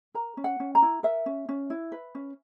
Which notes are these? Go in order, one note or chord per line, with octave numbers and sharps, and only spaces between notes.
A#4 A#5
C#4
F#5
C#4
A#5
E4
A#4 E5
C#4
C#4
E4
B4
C#4